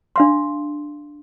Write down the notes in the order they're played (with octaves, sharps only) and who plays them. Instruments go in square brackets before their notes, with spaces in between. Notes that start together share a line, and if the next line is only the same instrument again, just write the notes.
[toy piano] D4 F5 C6